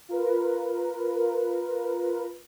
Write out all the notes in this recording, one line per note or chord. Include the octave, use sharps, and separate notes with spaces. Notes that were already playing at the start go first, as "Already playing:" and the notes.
F4 A#4 B4